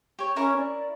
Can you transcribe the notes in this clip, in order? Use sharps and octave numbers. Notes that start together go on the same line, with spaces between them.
G4 C#5
C#4 E4 A#4 C#6
D5